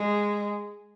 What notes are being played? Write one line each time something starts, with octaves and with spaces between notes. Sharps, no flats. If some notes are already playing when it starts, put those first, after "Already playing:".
Already playing: G#3